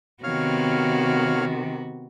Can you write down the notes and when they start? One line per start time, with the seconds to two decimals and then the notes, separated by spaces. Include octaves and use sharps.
0.24 C3 D#3 B3 F#4 C#5 F5 F6